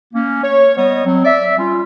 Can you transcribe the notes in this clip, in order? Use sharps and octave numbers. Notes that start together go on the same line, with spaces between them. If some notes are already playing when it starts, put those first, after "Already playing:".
A#3 C#4
C#5
G3 B3 C#5 D#5
F#3 C4
D5 E5
G3 C#4 F4